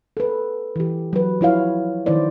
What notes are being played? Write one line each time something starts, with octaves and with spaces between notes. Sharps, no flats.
A4 B4
E3 G4
F#3 B4
F3 E4 C#5 F5
D#3 F3 D#4 E4 C5 D5